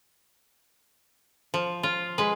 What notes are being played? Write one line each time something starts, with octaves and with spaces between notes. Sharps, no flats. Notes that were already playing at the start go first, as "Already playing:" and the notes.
F3
F4
G#3 B4